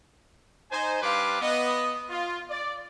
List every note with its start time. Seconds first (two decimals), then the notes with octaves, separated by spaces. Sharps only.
0.71 D#4 C5 G#5
1.02 G3 D4 B4 F5 C6 D6
1.41 B3 D#5
2.10 F4
2.50 D5